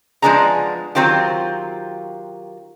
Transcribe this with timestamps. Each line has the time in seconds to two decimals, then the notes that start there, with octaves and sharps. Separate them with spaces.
0.22 F3 G#3 B3 D4 G#4 A#5
0.95 D#3 F#3 C4 F4 G4